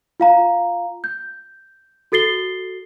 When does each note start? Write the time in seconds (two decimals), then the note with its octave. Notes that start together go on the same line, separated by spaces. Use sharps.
0.20 F4 F5 A#5
1.04 G6
2.12 F#4 A4 A6 C7 G7